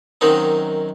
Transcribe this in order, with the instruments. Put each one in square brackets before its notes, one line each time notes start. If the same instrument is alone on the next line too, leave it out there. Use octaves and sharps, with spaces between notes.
[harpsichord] F#2 D#3 F#3 C4 D#4